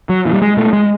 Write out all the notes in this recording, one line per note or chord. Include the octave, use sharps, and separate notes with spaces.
F#3
A#2 E3
G3
G#3
B2 A3
G#3